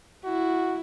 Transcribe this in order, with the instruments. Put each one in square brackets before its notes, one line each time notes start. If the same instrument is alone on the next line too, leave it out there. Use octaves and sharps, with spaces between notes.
[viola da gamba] E4 [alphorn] F#4